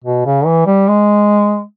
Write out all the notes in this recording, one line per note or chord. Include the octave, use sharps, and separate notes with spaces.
B2
C#3
E3
G3
G#3